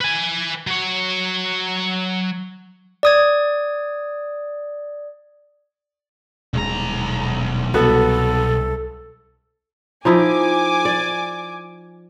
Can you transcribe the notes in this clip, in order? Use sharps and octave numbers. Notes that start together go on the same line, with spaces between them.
B4 G#5
F#3 C#5
D5 D#6 G#6
D#1 B1 G#3 A#5
C2 B3 F#4 A4 B4
F3 D#4 E4 G#5 D6
D5